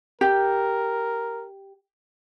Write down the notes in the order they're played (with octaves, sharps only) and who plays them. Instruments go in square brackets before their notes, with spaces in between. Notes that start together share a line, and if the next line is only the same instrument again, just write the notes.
[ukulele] G4 [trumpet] A#4